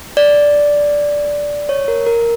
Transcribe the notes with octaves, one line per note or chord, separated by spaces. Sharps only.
D5
C#5
A#4
A#4